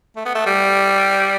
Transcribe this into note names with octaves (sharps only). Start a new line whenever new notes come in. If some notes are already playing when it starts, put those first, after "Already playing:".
A3
B3
A3
G3